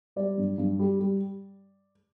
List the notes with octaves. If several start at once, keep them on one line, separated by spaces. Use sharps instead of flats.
G3 D5
G2
G2
G3
G3